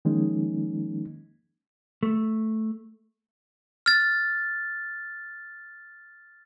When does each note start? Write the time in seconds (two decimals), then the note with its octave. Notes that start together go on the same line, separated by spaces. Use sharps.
0.05 D#3 F3 G#3 A#3 C#4 D#4
2.03 A3
3.86 F6 A6